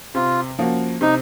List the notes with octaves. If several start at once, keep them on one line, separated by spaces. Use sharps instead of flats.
C3 F4
F3 A#3 C#4 F#4
C3 D#4